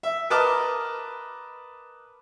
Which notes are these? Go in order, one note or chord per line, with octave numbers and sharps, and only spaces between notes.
E5
A#4 B4 D#5 A5 D6 F6